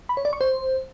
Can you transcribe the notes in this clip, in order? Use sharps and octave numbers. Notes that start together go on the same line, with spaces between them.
B5
C#5
D5
C#6
C5